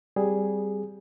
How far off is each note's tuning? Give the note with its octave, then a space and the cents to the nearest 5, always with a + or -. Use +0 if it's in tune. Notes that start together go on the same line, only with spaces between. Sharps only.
G3 +0 C4 +0 G#4 +0